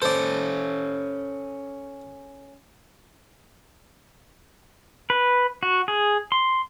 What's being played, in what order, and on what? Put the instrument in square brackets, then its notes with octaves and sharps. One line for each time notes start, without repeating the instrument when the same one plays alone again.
[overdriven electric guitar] C#4 A4 [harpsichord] C5 D5
[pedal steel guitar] B4
F#4
G#4
C6